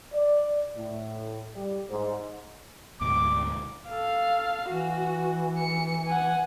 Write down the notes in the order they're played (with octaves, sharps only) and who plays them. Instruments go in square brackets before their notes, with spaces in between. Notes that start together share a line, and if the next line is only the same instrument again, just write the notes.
[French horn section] D5
A2
G3
G#2
[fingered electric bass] D2 G#2 B2 [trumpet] D6
[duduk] A4 [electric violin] F5
[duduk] E3 [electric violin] F#4
[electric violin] C#7
F#5 G#5